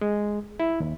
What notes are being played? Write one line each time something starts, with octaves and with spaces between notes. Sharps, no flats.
G#3
E4
D#2